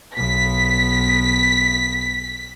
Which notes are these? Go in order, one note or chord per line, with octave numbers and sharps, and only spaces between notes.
B1 B3 B6